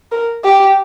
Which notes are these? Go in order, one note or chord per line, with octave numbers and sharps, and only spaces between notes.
A#4
G4